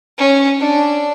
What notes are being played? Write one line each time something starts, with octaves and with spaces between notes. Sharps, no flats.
C#4
D4